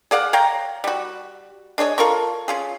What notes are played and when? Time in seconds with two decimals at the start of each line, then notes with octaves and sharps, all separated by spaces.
0.11 G#4 D5 F5 F#5
0.33 C#5 F5 G5 A#5
0.84 G3 F#4
1.78 D4 G#4 C#5 D#5
1.98 F4 A4 A#4 C#6
2.48 C#4 F4 G#4